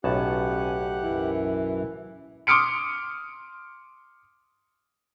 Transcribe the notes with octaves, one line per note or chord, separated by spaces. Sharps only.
B1 A2 C#4 G4 F#5 A5 F#6
F#2 E3
C6 D6 D#6 F6 C#7 D7